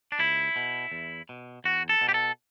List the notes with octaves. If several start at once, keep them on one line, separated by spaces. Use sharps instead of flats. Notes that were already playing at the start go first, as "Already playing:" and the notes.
D4
C#2 E4
B2
E2
B2
E2 F#4
A4
B2
G4
A4